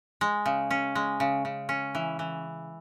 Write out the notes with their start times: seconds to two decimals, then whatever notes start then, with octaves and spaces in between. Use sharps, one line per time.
0.21 G#3
0.46 C#3
0.71 C#4
0.95 G#3
1.20 C#3
1.45 C#3
1.69 C#4
1.95 E3
2.19 E3